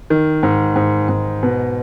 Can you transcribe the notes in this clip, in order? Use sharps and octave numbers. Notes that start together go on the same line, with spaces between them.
D#3
G#2
G#2
G#2
B2